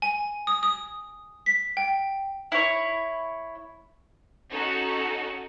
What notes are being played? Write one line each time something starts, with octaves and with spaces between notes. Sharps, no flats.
G#5
D#6
D#6
B6
G5
E4 C#5
C#4 D#4 F#4 A4